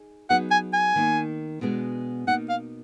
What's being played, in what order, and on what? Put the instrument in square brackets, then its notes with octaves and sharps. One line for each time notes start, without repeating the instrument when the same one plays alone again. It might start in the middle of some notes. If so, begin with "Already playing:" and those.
Already playing: [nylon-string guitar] D#4 G#4
[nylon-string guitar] F#3 B3 D#4 G#4 [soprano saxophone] F#5
[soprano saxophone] G#5
G#5
[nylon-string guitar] D#3 A#3 D#4
B2 G#3 B3 D4 G#4
[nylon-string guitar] B2 A#3 D#4 [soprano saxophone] F#5
[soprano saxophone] F5